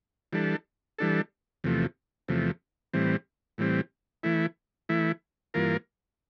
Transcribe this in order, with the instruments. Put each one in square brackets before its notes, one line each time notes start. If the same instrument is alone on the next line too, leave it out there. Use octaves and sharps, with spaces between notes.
[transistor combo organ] E3 G3 D4 A4
E3 G3 D4 A4
E2 C3 F3 A3
E2 C3 F3 A3
A2 E3 G3 C4
A2 E3 G3 C4
E3 A3 E4
E3 A3 E4
G2 E3 A#3 F4 A#4